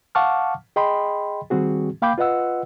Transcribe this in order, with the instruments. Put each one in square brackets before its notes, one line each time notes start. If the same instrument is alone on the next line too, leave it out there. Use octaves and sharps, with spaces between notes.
[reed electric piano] F5 F#5 A5 C#6 D6 F6
G#4 D#5 G5 B5 C6
D#3 G3 C4 F#4 G#4
A#3 F5 G5 B5 D6 G6
F4 B4 D#5 F#5 E6